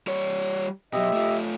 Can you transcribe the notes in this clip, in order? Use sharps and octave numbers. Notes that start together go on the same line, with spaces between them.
G3 C#5
B2 F#3 G4 D#5 E5
A3 F4